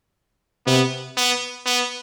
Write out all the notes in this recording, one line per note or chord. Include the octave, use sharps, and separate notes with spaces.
C3 B3
B3
B3